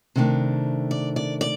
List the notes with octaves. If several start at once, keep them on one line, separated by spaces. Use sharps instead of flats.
C3 D#3 A3 D4
D5
D5
D5